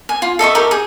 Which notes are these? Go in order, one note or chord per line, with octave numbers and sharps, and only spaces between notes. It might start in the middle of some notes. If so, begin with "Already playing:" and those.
G#5
F4
A4 D#5 E5 C#6
D#4 G4 A#4
G#4